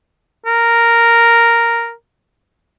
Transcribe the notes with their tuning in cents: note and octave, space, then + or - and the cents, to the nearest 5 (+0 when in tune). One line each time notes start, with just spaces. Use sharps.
A#4 -5